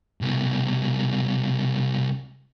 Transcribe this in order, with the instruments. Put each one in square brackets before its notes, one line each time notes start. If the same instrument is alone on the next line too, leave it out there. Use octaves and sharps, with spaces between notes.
[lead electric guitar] C2 B2